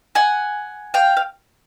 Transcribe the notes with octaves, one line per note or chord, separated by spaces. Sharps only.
F#5 G#5
F5 G5
F5